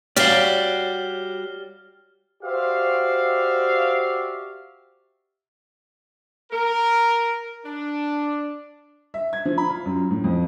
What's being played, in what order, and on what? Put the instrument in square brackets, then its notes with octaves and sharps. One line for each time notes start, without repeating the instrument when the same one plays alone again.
[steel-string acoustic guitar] G3 F#4 G4 [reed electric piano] C#5 [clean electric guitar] D5 F5 [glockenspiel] F6 G7
[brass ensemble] F#4 G4 C5 D5 E5 F5
[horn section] A#4
D4
[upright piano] E5
G#6
F3
B5
F4
F#2
A2
F2